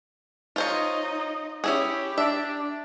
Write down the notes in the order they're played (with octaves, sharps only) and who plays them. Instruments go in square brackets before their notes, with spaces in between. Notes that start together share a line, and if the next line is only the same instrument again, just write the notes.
[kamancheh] D#4 D#5 [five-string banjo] F4 C5 C#5
[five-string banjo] C#4 E4 G#4 [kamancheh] G4
[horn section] D4 [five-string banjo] E5